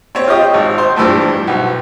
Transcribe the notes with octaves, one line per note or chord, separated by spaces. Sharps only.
C4 C#5
F4 G4 D#5
G#1
C5
G2 E3 F3 A3
B1